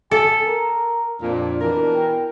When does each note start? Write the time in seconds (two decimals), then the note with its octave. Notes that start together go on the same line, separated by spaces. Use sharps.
0.11 A4 G#5
0.46 A#4
1.22 F2 A#2 D4
1.61 B2 E3 A#4
1.95 G5